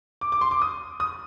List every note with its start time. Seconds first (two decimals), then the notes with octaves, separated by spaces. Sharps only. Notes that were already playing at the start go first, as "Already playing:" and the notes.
0.21 D6
0.32 D6
0.41 C6
0.51 D6
0.62 D#6
1.00 D#6